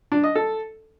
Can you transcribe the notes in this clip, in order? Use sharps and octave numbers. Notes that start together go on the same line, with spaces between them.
D4
D#5
A4